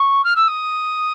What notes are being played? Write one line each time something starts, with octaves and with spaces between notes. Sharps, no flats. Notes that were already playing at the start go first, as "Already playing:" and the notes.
Already playing: C#6
F6
E6
D#6